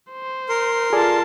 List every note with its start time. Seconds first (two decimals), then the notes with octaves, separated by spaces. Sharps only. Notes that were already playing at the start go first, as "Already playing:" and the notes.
0.11 C5
0.49 A#4 C6
0.93 F4 G#4 A4 D5 A5